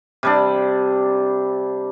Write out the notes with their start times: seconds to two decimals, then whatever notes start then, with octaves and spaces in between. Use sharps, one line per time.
0.23 C3 G3 D4